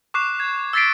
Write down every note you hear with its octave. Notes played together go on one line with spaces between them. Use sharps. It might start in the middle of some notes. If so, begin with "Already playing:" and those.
C#6 D6 F#6 C7 E7
G#6
E6 G#6 A6 B6 C7 D7